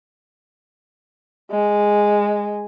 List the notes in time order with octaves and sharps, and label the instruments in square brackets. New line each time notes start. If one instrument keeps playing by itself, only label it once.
[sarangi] G#3